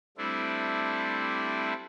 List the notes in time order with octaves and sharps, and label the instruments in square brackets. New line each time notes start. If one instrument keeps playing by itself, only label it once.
[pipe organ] G3 A3 C4 D4 E4